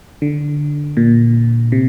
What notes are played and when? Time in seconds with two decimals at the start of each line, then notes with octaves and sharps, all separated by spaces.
0.22 D3
0.97 A#2
1.72 C3